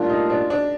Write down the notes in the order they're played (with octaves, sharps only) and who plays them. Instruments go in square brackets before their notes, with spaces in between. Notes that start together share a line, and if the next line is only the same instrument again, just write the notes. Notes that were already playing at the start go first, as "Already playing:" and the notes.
Already playing: [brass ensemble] A2 G3 A#3 F4 A4 [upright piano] D4
[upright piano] D#4
D4
D4